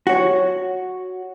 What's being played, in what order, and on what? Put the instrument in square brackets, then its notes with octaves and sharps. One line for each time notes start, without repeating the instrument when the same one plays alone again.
[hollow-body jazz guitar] F#4 C#5